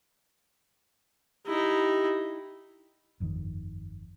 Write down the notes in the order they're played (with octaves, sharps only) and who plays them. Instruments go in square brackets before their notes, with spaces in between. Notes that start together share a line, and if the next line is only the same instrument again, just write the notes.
[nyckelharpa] D#4 E4 [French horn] G4
[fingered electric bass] G1 F2 G#2 D#3